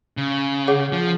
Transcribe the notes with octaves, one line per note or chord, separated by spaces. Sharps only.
C#3
G#4 C#5 F#5
F3